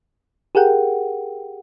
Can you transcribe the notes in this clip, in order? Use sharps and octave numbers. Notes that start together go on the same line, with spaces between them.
G4 G#4 A#4 F#5 G5